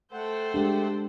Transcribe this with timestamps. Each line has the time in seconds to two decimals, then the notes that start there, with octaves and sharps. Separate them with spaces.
0.13 A3 A4 C5 F#5 G5
0.54 G#3 D4 G4